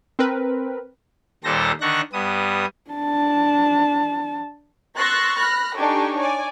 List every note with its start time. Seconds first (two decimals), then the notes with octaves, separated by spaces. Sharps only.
0.19 C4 A#4 B4
1.44 D#2 A#2 G3 A4 C5 A#6
1.81 D3 D#3 D4 C#6 F#6 A#6
2.13 G2 G3 B3 D#6
2.91 D4 A5
4.99 C6 C#6 E6 F#6 A6 A#6
5.39 B5 F6 F#6 A#6
5.77 D4 D#4 G4 A4 G#5 C#6
6.19 C#5 D5 G#5